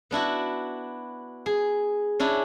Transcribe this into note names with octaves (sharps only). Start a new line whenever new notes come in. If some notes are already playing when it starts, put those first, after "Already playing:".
B3 D4 E4 F#4
G#4
C#4 D4 E4